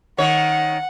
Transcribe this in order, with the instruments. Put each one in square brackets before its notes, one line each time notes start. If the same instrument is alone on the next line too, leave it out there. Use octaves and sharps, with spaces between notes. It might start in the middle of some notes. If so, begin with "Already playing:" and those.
[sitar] D#3 C#5 [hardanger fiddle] F#5